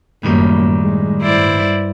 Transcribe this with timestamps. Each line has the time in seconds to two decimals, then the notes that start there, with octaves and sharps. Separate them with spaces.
0.23 F#2 A2 D#3 G3 A#3
0.82 G#3
1.22 G2 E4 C5 D5